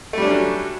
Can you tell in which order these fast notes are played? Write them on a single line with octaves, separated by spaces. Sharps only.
A3 G3 D4 C#4 F#3